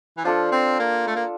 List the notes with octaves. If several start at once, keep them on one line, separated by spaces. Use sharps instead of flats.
E3
F3 D4 F4 A4 D5
C4
A#3
A3
A#3